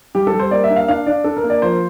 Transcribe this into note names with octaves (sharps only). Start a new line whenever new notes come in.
G3 G4
A4
G3
C5
A#3 D5
E5
D4
F5
D4 F5
D4 D5
D4 A4
A#4
A#3
D5
F3 C5